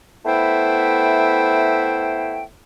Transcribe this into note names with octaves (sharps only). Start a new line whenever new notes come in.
A3 B3 E4 C5 E5 G5